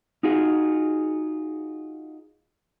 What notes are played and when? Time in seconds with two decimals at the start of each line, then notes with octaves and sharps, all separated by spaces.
0.23 D#4 F4 F#4 G#4